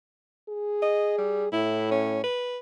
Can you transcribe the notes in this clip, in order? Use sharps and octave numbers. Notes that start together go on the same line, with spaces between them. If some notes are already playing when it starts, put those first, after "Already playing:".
G#4
D#5
G3
A2 E4
C#4
B4